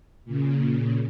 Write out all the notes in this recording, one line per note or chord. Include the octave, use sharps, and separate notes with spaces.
A#2 C#3